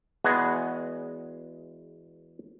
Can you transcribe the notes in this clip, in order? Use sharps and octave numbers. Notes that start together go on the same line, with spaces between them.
E2 G#3 B3 F#4 G#4